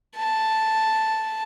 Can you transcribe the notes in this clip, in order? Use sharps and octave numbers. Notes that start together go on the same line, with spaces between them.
A5